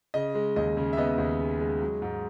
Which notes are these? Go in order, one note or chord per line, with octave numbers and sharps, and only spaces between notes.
C#3 D#5
G#3
D#2 D#5
C#3
E5
B3 D#5
D#2
G#3
G#3
F#3
G#2